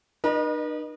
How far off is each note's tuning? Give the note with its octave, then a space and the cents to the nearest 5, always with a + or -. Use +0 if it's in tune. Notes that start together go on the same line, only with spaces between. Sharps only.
D#4 -45 B4 -45 D#5 -20